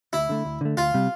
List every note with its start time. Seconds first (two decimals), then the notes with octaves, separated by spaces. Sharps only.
0.13 D2 E4
0.29 D3 A3
0.45 D2
0.61 D3 A3
0.77 D2 F4
0.94 C3 G3